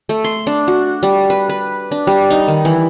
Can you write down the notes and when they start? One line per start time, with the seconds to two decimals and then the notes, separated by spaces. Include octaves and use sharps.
0.09 A3
0.24 C6
0.47 D4
0.68 F#4
1.03 G3
1.30 B4
1.49 B4
1.91 D4
2.07 G3
2.30 D#4
2.48 D#3
2.65 E3